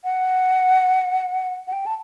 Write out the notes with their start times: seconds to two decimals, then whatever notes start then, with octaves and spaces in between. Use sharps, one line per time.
0.04 F#5
1.68 F#5
1.73 G5
1.86 A5